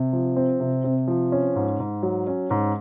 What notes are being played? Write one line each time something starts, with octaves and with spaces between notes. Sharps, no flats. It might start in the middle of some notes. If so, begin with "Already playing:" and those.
Already playing: C3
F3
C4
C3
C3
F3
C#4
G#2
G#2
F#3
C#4
G#2